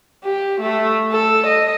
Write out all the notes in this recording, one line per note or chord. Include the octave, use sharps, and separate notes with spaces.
G4
A3
A4
D#5